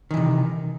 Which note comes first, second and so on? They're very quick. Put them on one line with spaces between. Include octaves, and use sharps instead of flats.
D#3 E3 C3